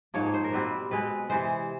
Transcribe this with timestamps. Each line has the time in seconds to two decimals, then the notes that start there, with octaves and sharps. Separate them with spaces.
0.14 G#2 F3 A#3 C#5
0.34 C5
0.44 A#4
0.53 B2 G3 C4 B4
0.91 B2 G#3 C4 B4
1.30 C3 E3 G#3 C5